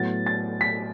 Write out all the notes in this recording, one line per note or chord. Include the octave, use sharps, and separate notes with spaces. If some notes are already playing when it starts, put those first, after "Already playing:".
Already playing: A2 F#3 B3 A6
A6
B6